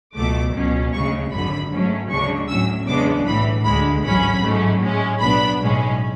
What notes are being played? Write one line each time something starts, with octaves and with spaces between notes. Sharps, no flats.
C#2 B2 F#3 A3 D6
C#2 B2 F#3 C#4
D2 C#3 G#3 C#6
G#1 F#2 D3 B5
G#2 F#3 A3 C#4
D2 C#3 G#3 D4 C#6
A2 F#3 C#4 E6
E2 C#3 G#3 B3 D4 D6
B1 A2 E3 B5
D2 D3 G#3 B5
A1 G#2 F#3 C#4 B5
G#2 F#3 A3 C#4
A2 G#3 C#4
B1 A2 F#3 B3 D4 B5
B1 A2 G#3 C#4